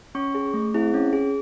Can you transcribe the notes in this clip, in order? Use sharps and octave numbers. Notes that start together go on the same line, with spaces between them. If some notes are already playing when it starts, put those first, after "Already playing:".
C#4 C#6
G#4
A3
C4 E4 G#4
C#4
G#4